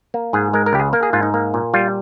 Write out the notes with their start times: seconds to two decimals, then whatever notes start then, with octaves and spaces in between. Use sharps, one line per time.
0.14 A#3
0.33 G#2 G#4
0.53 G#3 A#4
0.66 A#4
0.73 C#2 G4
0.79 G#4
0.93 A#3 A#4
1.03 G#4
1.13 G#2 F4
1.23 D#4
1.34 A#3
1.54 A#2
1.74 G3 F4